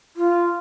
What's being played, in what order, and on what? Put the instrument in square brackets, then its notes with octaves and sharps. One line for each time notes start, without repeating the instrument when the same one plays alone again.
[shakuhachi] F4